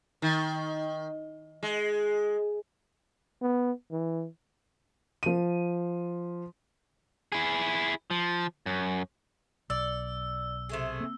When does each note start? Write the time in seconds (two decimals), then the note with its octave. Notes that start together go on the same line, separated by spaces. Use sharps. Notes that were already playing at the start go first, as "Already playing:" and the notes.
0.22 D#3
1.63 G#3
3.42 B3
3.91 E3
5.23 F3 D#7
7.32 E4 G#4
8.10 F3
8.66 F#2
9.70 B1 D5 E6
10.69 C3 A3 G#4
11.01 A#3 C4